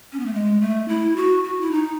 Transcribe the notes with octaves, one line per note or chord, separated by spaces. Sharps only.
C#4
B3
A3
G#3
A3
E4
F#4
F#4
E4
D#4